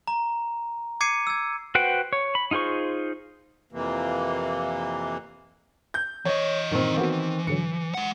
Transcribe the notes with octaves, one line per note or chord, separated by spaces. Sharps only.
A#5
D6 G#6 C7 C#7 D#7
E6 G#6
F#4 B4 C5 F#5 G5
C#5
B5
D#4 F4 G#4 C5 C#6
F2 C3 E3 A#3
G6
E3 C#5 D#5
G2 A#2 D#3 C4
E3 A#3 B3 F#4
G#2 D3 F#3 C#7
G#3 F#5